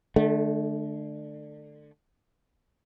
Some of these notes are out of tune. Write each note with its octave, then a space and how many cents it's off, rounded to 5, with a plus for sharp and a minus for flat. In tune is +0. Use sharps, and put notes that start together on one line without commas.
D3 +20 A3 -25